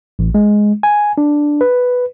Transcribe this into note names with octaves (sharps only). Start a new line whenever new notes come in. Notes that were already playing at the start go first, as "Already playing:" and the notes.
A1
G#3
G#5
D4
B4